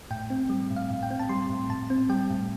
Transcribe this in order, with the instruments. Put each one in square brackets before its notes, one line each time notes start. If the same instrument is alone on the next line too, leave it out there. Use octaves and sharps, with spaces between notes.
[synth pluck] A2 G5
C4
G3
A2
F5
A2
G5
C4
A5
G3 C6
A2
A2 A5
C4
G3 G5
A2